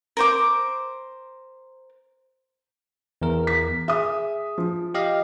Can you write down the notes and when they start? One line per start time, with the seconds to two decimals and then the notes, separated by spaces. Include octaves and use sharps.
0.17 A#4 C5 D6
3.22 E2 A#4
3.47 B6
3.88 G#4 E5 D#6
4.58 F3
4.94 G4 D#5 F5